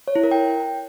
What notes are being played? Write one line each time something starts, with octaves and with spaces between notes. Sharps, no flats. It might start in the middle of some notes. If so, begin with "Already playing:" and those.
C#5
E4
A#4
G5